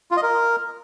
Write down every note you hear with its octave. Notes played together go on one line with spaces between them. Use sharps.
F4
D#5
A#4